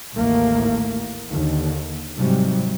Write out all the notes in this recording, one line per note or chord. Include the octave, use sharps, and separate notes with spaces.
A1 D#2 A2 A3 A#3
D#2 D3
G#2 C3 F#3 G3